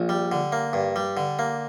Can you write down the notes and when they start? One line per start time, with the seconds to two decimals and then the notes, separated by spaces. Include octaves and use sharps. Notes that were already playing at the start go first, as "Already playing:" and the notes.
Already playing: A#1
0.09 G3
0.32 D3
0.52 A#3
0.73 G2
0.96 G3
1.17 D3
1.39 A#3